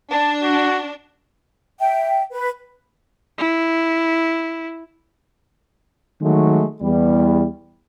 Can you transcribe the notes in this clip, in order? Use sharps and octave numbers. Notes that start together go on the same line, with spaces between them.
D4 A5
F#4
E5 G5
B4
E4
D#3 F#3 G#3 A3
E2 G3